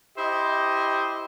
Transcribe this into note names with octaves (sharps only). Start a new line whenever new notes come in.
E4 G4 C5 D#5